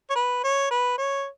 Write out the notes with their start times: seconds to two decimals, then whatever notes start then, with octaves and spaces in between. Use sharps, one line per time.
0.10 C#5
0.16 B4
0.44 C#5
0.71 B4
0.98 C#5